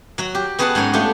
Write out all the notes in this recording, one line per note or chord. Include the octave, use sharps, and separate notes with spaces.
F#3 F#4
G4
B3 F#4 G#4 B4 F#5 A5
G#2 F#3 C#4 C#5 G#5
A3 D4 F4 G4